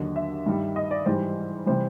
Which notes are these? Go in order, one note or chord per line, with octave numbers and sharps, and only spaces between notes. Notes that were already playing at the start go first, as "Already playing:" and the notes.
Already playing: D#2 D3 F#3 D#5
E5
G2 D#3 G3
D#5
D5
G#2 E3 G3 C5
C3 E3 G3 C5